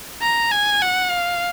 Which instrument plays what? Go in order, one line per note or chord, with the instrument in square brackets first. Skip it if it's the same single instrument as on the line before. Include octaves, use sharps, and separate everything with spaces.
[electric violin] A#5
G#5
F#5
F5